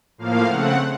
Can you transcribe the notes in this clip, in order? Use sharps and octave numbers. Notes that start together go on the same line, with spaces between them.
A2 F3 A#3 F5
C#3 A3 C4 F#5